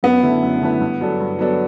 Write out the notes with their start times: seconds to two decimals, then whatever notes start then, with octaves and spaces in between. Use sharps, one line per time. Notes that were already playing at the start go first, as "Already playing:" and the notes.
0.03 F#2 B3
0.23 D3 A3 E4 B4
0.43 F#2
0.61 D3 A3 E4 B4
0.81 G2
1.01 F#3 B3 D4 A4
1.20 G2
1.39 F#3 B3 D4 A4